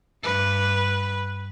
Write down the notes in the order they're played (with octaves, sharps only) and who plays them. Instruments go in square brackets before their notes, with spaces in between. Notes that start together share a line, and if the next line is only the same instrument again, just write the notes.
[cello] G2 B4